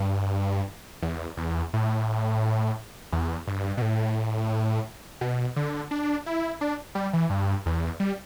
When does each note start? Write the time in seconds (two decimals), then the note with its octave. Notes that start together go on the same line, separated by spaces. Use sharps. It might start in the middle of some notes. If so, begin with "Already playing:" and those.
Already playing: G2
1.02 E2
1.37 E2
1.73 A2
3.12 E2
3.47 G2
3.77 B2
3.82 A2
5.21 B2
5.56 D3
5.91 D4
6.26 E4
6.61 D4
6.95 G3
7.13 E3
7.30 G2
7.66 E2
8.00 G3